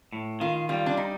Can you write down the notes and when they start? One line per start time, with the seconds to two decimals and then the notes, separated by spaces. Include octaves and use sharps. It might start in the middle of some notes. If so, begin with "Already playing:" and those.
0.13 A2
0.40 D#3 F4
0.69 G3 F4
0.86 D4
0.97 D#4